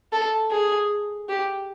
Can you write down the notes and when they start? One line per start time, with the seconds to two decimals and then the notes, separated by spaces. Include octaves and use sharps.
0.12 A4
0.51 G#4
1.29 G4